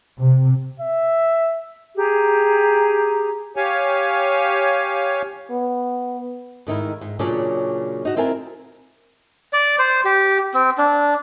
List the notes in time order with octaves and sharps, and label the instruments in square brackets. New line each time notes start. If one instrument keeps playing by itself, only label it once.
[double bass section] C3
[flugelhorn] E5
[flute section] G4 G#4 A#5
[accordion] G4 C#5 F5 G#5
[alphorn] B3
[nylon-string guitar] G#2 D#3 D#4 E4
G#2
A#2 C#3 F#3 C#4 D4 D5
D#4 F#4
C4 E4 F4 A#4 G#5
[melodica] D5
C5
G4
C4
D4